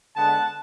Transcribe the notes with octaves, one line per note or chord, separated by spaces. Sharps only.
D3 G#3 B3 F#5 A5